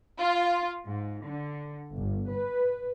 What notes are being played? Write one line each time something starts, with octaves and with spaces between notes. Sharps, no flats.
F4
G#2
D3
G1
B4